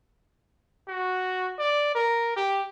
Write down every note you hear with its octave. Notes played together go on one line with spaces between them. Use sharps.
F#4
D5
A#4
G4